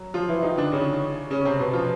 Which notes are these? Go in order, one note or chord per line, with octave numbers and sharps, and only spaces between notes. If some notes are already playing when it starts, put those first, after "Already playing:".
Already playing: F#3
F3 F4
E3 E4
D#3 D#4
D3 D4
C#3 C#4
C#3 C#4
C#4
C3 C4
B2 B3
F3 F4